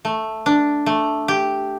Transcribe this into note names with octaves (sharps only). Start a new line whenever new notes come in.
A3
D4
A3
G4